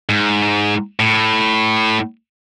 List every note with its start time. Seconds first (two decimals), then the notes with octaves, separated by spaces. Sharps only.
0.09 G#2
1.00 A2